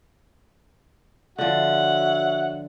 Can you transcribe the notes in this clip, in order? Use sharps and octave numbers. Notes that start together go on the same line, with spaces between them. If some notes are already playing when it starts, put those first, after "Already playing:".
D3 F3 F#4 C#5 E5 F#5